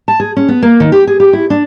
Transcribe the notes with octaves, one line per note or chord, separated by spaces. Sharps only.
A5
G#4
C#4
B3
A#3
D#3
G4
G#4
G4
E4
D4